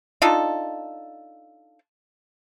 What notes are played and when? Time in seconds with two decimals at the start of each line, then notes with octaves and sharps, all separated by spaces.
0.22 D4 D#4 F4 A4